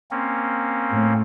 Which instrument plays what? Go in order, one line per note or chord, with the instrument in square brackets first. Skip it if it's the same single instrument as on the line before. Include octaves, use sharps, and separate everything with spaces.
[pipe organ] A#3 C4 C#4
[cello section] A2